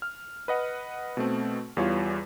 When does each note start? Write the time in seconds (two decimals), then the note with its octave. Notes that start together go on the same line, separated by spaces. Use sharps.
0.02 F6
0.48 B4 D#5 F#5
1.17 B2 A3 C4
1.77 E2 E3 G3 F4 C#5